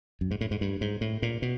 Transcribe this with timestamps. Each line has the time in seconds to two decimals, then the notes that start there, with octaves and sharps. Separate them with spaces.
0.21 F#2
0.31 G#2
0.41 A2
0.51 G#2
0.61 G2
0.81 G#2
1.01 A2
1.22 A#2
1.42 B2